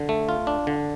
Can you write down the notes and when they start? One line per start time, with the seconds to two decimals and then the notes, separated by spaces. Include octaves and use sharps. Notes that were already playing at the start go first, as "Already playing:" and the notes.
Already playing: D3
0.09 A3
0.29 F4
0.47 D4
0.67 D3